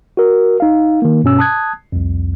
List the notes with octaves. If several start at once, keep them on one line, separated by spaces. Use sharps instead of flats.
F#4 A#4
D#4 F5
D#3 A#3
G2 B2 C#4 E6
A5 D#6 F#6 G#6
C2 F2